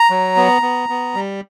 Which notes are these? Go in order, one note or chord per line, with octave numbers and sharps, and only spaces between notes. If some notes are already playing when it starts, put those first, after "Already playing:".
Already playing: A#5
F#3
B3
B3
B3
G3